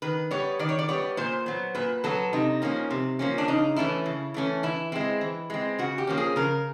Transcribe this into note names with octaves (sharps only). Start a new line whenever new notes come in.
D#3 B4
G3 B3 C#5
D#3 D5
C#5
D5
G3 B3 C#5
A#2 C5
F#3 B3
A#2 B4
F#3 B3 A4
C3 D#4
F3 A#3 C#4
C3
F3 A#3 C#4
D4
C#3 D#4
E3 A3 C#4 E4
C#3
E3 A3 C#4
E3 E4
G#3 C4 E4
E3
G#3 C4
C#3 F#4
G4
F3 A#3 C#4
G#4
C#3 A#4